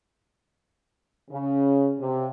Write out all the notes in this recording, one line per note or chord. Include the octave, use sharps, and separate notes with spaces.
C#3
C3